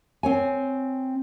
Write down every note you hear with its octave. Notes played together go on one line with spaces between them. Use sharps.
C4 C#5 G#5